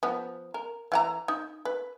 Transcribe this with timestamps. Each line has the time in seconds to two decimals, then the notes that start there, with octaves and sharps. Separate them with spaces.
0.03 F3 B3
0.54 A#4
0.92 E3 F#5 A#5
1.28 D#4
1.65 B4